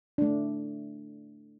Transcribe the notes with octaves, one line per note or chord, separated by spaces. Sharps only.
A3 D4